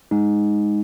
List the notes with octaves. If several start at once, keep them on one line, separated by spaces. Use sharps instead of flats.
G#3 D#4